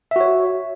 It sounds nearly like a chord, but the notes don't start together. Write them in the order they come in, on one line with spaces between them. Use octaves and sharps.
E5 F#4 C#5